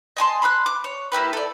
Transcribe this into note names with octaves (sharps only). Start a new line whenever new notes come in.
D#5 G#5 A5 C6
B5 C6 E6 F#6
D6
C#5
A#3 E4 G4 B4
A4 D5